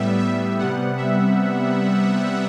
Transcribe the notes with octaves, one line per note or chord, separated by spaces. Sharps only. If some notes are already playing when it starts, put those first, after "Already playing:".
Already playing: A2 G3 B3 E5
E5
C3 G3 B3 F#5
E5